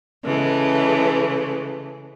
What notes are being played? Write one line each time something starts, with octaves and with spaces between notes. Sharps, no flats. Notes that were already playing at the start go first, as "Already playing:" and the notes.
C#3 E3 G#3 A3